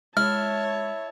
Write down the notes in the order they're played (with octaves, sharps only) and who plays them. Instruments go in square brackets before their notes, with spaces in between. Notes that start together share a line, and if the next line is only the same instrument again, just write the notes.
[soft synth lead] G#3 [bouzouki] E4 [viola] C#5 A5 [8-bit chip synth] F6